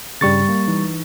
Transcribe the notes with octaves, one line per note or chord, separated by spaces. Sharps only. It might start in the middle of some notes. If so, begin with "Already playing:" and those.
G2 C#3 G3 C#6 A6
A#3
E3 D#4